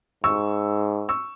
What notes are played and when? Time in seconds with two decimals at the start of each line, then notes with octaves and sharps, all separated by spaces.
0.24 G#2 C#6 E6
1.09 C#6 E6